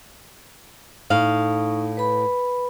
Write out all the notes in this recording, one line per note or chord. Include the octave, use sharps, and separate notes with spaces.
A2 D#4 F5 C#6 D#6
B4 B5